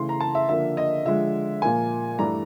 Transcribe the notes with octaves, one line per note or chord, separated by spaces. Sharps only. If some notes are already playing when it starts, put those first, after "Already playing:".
Already playing: C#3 E3 A3 C6
A#5
A5
E5
D3 F3 A#3 E5
D#5
D3 F3 G#3 E5
A#2 F3 A#3 G#5
G2 E3 A3 D4 A#5